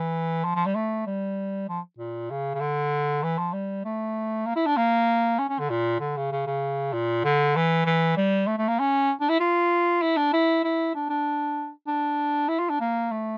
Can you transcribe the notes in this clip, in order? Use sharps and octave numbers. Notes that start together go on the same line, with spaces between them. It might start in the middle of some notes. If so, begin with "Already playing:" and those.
Already playing: E3
F3
F3
G3
A3
G3
F3
A#2
C#3
C#3
D3
E3
F3
G3
A3
A#3
E4
D4
A#3
C#4
C#4
D3
A#2
D3
C#3
C#3
C#3
A#2
D3
E3
E3
G3
A3
A3
A#3
C#4
D4
E4
F4
E4
D4
E4
E4
D4
D4
D4
E4
F4
D4
A#3
A3